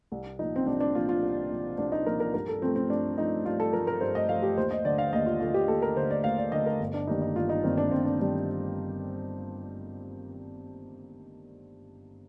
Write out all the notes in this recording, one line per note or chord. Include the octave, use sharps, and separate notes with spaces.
C2
A#2 F3 D#4
C4
C2 D4
D4
A#2 F3 F4
F4
C2
A#2 F3
C2 D4
D#4
A#2 F3 A#4
A#4
G2 A#4
A4
F3 A3 C4
C4
G2 D4
F3 A3 D#4
G2 F4
A4
F3 A3 A#4
A#4
G2 C5
D#5
F3 A3 F5
G4
D#2 C5
D#5
D3 A3 D5
F5
D#2 D#5
F4
D3 A3 F4
G4
D#2 A4
A#4
D3 A3 C5
D5
D#2 F5
D5
D3 A3 D#5
A#4
G1
D4
G2 D#3 G3 A#3 D#4
D#4
G1 F4
D#4
G2 D#3 G3 A#3 C4
D4
G1 C4
D4
D#3 G3 D4